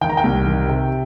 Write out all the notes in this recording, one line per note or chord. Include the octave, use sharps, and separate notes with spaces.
D#3 G5
A#5
G5
C2
D#3
C3